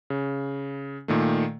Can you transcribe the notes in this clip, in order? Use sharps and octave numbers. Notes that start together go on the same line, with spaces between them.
C#3
A#2 D#3 A3